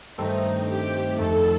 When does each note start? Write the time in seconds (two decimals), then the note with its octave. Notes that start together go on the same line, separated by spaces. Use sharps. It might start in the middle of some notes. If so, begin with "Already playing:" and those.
0.18 G2 D#3 A3 C4 D#4
0.69 G4
1.19 F2 D#3 A3 A4